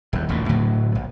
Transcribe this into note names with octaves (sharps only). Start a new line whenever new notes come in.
D#1 E2
D#1 A1 D2 A#2
D1 A2 D3 F#3
A#1